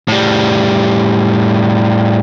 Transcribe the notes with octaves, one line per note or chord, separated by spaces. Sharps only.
A2 G3